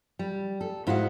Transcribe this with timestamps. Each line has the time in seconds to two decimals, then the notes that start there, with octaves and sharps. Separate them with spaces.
0.19 G3
0.61 A4
0.87 G#2 E4 F#4 D#5 F5 F#5